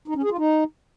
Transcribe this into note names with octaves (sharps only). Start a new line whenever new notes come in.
D#4
C#4
G#4
F4
D#4